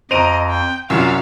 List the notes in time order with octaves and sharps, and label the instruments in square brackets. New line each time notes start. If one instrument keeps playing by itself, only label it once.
[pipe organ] F2 [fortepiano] C5 A#5 [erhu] D#5 [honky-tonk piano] D7 D#7 F7
[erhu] G5
[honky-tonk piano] C2 [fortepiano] F#2 [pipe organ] F4 E6 [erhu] F5